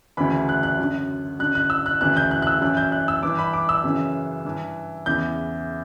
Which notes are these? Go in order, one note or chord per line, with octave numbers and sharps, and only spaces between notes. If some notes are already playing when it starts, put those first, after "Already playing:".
D2 C#3 E3 B5
F#6
F#6
F#2 D3
F#2 D3 F#6
F#6
E6
F#6
D2 C#3 E3 F#6
G6
F#6
F#6
E6
F#2 E3 F#6
G6
F#6
E6
G2 E3 D6
B5
D6
E6
F#2 C#3 E3
G2 E3
E2 C#3 E3 G6